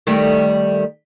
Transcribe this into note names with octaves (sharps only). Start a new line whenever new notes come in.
D#3 G3 A3